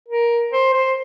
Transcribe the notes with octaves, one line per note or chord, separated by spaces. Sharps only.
A#4
C5
C5